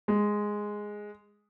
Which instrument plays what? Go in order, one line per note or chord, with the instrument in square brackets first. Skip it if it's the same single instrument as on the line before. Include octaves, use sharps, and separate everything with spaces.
[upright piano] G#3